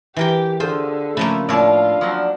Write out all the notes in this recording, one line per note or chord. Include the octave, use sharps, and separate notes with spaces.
E3 G4 A#4 G5
D3 F4 G#4 A4 C5
C#3 F3 A3 A#3 B5
A2 D4 F4 C#5 D5 A5
F3 F#3 D4